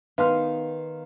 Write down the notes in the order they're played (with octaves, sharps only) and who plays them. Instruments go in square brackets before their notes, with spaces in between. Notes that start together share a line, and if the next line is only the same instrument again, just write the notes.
[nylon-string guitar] D#3 B3 D#4 [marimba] B4 [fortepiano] F5 C6 F6